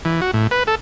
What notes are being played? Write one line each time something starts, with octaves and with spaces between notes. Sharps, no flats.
E3
F#4
A2
B4
A4